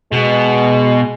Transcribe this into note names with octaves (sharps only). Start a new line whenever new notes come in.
B2 G#3